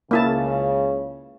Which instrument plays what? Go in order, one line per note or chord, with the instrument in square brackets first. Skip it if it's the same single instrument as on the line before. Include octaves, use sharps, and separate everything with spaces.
[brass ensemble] C#2 C#3 [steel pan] A#3 E4 A5